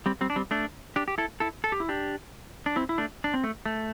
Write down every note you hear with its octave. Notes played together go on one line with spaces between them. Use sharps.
G3 C4
G3 C4
D4
G3 C4
A3 D4
D4 G4
G4
E4 A4
E4 A4
A4
G4
E4
D4 G4
D4
C4 E4
E4
A3 D4
D4
C4
A3
A3